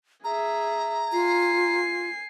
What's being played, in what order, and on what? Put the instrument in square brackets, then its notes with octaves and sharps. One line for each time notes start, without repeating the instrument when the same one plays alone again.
[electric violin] G#4 E5 [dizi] A#5
[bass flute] F4 [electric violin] G#5 C7